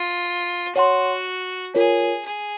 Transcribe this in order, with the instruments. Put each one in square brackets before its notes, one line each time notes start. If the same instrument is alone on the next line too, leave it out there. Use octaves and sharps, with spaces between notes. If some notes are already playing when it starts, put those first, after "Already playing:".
Already playing: [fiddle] F4
[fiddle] F#4 [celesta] C#5 F#5 C6
[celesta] F4 A#4 C#5 [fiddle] G#4
[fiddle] G#4